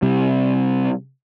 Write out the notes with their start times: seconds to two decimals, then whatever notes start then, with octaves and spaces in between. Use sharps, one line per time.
0.02 C3 G3